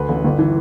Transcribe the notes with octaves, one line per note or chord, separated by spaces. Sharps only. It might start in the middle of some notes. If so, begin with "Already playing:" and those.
Already playing: D2 B4
A1
G1
E3